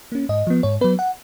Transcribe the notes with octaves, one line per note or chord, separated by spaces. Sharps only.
A#3 C#4
G#2 D#5
F3 B3
G#2 C#5
F#3 B3 B4
F#5